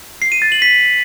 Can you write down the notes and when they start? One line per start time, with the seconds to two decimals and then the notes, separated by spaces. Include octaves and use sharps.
0.22 C7
0.32 D#7
0.42 A6
0.52 F#7
0.62 B6